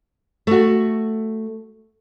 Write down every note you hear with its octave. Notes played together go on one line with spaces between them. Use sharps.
A3 F#4